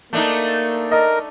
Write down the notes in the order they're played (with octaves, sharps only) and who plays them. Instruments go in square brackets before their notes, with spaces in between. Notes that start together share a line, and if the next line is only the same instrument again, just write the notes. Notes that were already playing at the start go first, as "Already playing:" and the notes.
[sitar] A3 D4 D#4 [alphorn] A#3
[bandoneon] A#4 [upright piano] D#5